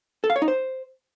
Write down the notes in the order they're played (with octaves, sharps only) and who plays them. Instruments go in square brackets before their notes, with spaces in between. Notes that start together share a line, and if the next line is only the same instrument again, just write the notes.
[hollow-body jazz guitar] A4
F5
C#5
D#4
C5